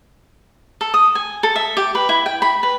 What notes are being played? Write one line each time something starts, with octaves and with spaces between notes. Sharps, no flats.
A4
D#6
G#5
A4
E5
G4
B4
E4
G5
B5
B4